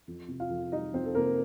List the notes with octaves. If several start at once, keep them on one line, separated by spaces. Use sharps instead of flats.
F2
C3
F4 F5
F2
G3 D#4 D#5
F2 C4 C5
A4
C3 A#3 A#4